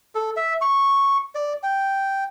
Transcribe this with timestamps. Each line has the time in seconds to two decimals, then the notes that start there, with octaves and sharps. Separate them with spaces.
0.15 A4
0.37 E5
0.61 C#6
1.35 D5
1.63 G5